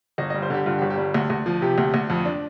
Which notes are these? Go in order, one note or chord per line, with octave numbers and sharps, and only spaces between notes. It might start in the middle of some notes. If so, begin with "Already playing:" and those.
G1 D#5
D#5
G3
C5
D3 G4
G2 F4
G4
G1
G4
G3
D2
D2
F3
C3 G4
D2
D2
F2
D4